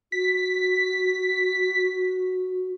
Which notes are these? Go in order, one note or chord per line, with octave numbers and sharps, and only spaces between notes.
F#4 B6